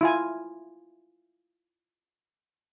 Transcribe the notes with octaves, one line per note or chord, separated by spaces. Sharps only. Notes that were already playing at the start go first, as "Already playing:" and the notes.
E4 F4 G#5